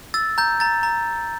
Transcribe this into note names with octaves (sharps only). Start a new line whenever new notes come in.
E6 A6
A#5 G6
A#5 A6
A#5